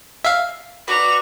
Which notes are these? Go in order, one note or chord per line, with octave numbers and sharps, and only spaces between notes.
E5 F5
F#4 B4 D5 A#5 F7